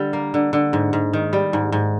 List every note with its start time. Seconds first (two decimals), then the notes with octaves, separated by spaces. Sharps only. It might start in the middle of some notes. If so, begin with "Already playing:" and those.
Already playing: D3 G3
0.13 A#3
0.34 D3
0.53 D3
0.73 G#2
0.93 G#2
1.13 D#3
1.33 G3
1.53 G#2
1.72 G#2